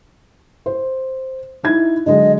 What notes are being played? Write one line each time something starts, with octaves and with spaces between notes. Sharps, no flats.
C5
D#4 E4 G#6
D3 F#3 G#3 D#5